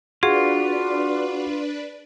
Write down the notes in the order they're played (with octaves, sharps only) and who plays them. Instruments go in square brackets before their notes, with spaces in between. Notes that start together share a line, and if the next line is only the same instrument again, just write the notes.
[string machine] D4 B4 D5 [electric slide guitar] F4 [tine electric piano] F#4 [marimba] G#4